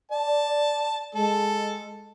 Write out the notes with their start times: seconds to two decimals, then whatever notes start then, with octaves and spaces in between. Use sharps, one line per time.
0.11 D5 A5
1.15 G#3 A4